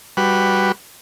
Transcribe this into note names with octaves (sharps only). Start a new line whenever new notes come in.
G3 F#4 B4